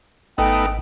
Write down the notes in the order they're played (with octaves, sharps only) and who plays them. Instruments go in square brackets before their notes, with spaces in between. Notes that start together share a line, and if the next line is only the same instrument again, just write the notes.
[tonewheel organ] G#1 [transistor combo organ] A3 B3 D#4 [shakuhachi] G5